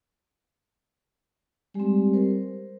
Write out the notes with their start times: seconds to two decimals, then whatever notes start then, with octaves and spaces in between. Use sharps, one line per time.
1.75 G3 G#3 C4
2.13 A#4 C5